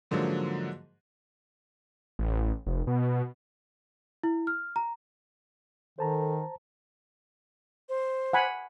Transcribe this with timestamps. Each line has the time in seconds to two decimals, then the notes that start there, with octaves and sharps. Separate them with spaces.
0.11 G#2 D3 F3 F#3 A#3
2.19 A1
2.67 F1
2.87 B2
4.23 E4
4.47 F6
4.76 A#5
5.99 D#3 A4 C5 A5 A#5
7.89 C5
8.33 F#5 G#5 B5